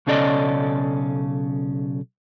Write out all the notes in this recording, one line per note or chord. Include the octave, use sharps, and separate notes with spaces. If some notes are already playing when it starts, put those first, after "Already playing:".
B1 C#3 C#4 A4 D5 D#5